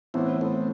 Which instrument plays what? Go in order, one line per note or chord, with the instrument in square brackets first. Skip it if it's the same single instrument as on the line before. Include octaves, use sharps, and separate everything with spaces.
[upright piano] A2 E3 B3 [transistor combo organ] C4 E4
[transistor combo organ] A3 C4